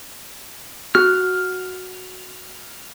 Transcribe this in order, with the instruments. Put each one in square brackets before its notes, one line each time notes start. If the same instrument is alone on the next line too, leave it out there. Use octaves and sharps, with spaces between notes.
[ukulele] F#4 [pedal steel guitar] F6